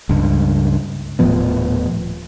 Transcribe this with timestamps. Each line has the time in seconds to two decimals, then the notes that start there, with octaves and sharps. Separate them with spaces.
0.09 C#2 G2
1.19 D#1 A2 F3 B3